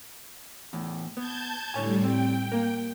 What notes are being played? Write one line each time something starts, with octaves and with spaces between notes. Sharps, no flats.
E2 A2
B3 A5 G6 G#6
A2 D3 G3 C#5 G#5
C4 G5
A#3 A#4